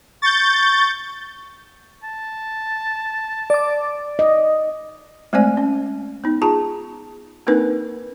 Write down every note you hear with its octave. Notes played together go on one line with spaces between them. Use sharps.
C#6 G6 A6
A5
D5 D6
D#5
G#3 A3 C4 C5 D5 G#5
C#4
B3 D#4
F4 G#4 A5 A#5
A#3 C4 D4 D#4 A#4 B4